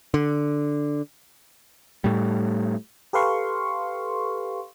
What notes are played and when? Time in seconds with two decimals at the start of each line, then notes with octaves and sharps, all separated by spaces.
0.14 D3
2.04 A2 G3
3.13 G4 A4 B4 F5 C6 C#6